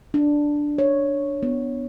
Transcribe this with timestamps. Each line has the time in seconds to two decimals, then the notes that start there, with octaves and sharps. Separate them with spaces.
0.14 D4
0.78 C#5
1.43 B3